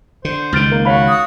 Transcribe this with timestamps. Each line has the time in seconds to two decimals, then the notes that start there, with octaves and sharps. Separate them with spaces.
0.25 D3 C5
0.52 C#2 D#3 F6 A6 D7
0.71 A#3
0.85 F#4 C#5 F5 B5
1.09 D#6